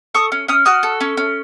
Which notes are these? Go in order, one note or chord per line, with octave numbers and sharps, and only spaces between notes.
A4 C#6 D#6
C#4
C#4 D#6 F6
F#4 D#6 F6
A4
C#4
C#4